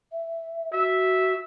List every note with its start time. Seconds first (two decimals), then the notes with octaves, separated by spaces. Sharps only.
0.12 E5
0.73 F#4 E5